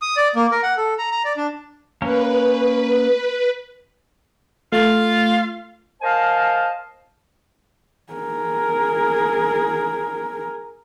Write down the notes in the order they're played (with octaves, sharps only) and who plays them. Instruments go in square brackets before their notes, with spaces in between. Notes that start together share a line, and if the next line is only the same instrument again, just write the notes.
[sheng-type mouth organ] D#6
D5
A#3
A#4
F#5
A4
A#5
A#5
D5
D4
[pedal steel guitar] A#3 C#4 A#4 [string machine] B4
[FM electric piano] A3 [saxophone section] F4 F5
[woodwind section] A#4 C5 D#5 F5 G#5 A5
[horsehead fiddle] G#4 A#4